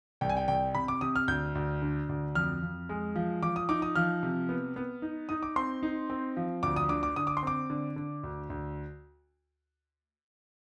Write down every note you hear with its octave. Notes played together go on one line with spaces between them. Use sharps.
C2 G5
G#5
G5
C2 G5
C3 B5
D6
C3 D#6
F6
D2 G6
D2
D3
D2
F2 F6
F2
G#3
F3
F3 D6
D#6
D#4 D6
D#6
F3 F6
C3
B3
B3
D#4
D#4 D#6
D6
C4 C6
D#4
C4
F3
D2 D6
D#6
D3 D6
D6
D3 D#6
D6
C6
C4 D6
D3
D3
D2
D2